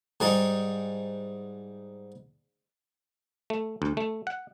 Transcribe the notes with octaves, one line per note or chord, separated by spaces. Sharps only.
G#2 G3 G#3 D#4
A3
D2
A3
F#5